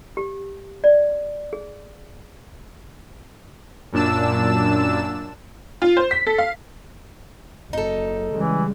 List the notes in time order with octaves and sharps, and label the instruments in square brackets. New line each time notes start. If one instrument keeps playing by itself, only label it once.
[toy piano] G4
D5
G#4
[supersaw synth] F#2 A#2 D4 A5 E6 E7
[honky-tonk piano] F4
C5
B6
A4
F5
[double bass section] F#1 [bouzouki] D#4 A4
[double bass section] C#3 G3 G#3 [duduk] E3